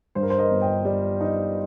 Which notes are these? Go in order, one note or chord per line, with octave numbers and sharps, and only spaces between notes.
G2 C5
A#4
C5
A#4 D#5
G1
D#5 G5
G3
D#4